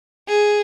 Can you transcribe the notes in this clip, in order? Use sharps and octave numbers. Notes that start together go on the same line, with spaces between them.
G#4